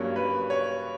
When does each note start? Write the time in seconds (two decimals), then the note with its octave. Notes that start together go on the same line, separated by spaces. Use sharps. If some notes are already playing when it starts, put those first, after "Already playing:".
Already playing: G2 F#3 A#3 C#4 C#5
0.16 B4
0.50 C#5